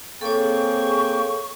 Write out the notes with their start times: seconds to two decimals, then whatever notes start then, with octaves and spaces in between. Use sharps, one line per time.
0.21 A#3 C4 G#4 A4 C#5 G5 C#6